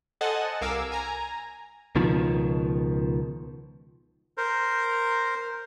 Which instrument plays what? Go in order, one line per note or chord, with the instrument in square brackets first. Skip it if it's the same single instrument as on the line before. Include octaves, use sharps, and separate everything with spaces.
[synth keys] A4 C5 D#5 F#5 G#5 A5
C2 A#4 F5 G#5 D6 E6
G#5 A#5
[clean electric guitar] C#2 B2 D#3 F3
[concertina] A#4 C5